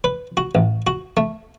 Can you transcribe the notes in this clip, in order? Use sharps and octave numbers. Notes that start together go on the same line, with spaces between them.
B4
F#4
A1
F#4
A3